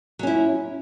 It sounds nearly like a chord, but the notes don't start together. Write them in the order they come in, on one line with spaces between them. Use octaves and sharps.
F#3 C#4 E4